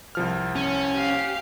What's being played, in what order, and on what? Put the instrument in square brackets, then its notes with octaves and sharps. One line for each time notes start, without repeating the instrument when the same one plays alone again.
[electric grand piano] C2 F3 F6
[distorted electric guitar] C#4
[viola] G4 F5